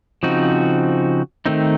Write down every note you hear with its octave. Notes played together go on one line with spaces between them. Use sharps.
C#3 F3 C4 D#4 F#4
D#3 A3 C4 D#4